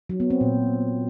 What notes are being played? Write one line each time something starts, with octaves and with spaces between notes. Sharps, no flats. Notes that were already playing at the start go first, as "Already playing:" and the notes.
F#3
B3
C4
A#2